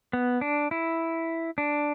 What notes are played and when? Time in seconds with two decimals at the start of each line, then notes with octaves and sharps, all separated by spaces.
0.13 B3
0.41 D4
0.71 E4
1.58 D4